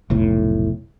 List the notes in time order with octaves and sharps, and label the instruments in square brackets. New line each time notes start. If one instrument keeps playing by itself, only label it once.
[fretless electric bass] F1 B1 A2